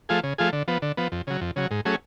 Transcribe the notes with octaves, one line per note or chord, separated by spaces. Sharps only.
F3 A3 F4 G#4
C#3
F3 A3 F4 G#4
D3
F3 B3
D3
F3 B3
F2
C#3 F#3
F2
C#3 F#3
G#2
F#3 A3 C#4 G#4